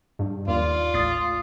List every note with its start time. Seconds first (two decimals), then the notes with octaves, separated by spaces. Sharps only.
0.19 G2
0.48 D#2 F4 D5
0.94 A1 D#6 A6 C7